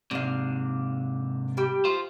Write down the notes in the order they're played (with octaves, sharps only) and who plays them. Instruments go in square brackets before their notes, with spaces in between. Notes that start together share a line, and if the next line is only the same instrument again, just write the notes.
[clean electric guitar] G#2 C3 [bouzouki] D4 F5
[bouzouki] G3 G4
[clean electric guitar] F4 C5 [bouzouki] F5